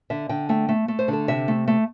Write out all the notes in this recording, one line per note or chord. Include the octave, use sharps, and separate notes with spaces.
D3 E5
D3 G5
A3 G5
A3
A3
C5
D3
A4
C3 E5
A3
A3